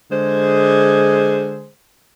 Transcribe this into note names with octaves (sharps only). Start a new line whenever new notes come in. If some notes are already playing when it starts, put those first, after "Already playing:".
D3 G#3 G#4 C5